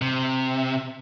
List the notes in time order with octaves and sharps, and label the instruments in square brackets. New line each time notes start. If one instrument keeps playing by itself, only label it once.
[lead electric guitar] C3